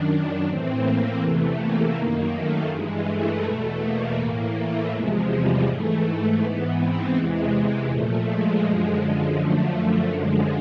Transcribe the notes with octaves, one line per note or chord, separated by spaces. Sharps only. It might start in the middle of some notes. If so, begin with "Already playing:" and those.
Already playing: F#2 D#3 D4
A2 E3 C4
A#3
E2 C3 E3 A3
A#3
F#2 D#3 A#3
A3
G2 E3 G#3
A3
E2 B2
A#3
A2 E3
A3
E2 C3 F3 G#3
G3
G#2 E3 A3
G#2 E3 B3
C4
E2 C3 E3 G#3
G#3
A#2 F3 A3
G#3
F#2 D3 F3
G#3
F#2 D3 F3 A3
F#2 D3 F3 G#3